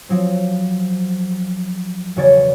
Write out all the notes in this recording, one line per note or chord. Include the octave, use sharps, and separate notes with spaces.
F3 F#3 C4
E1 C#3 F#4 C#5 D5 A6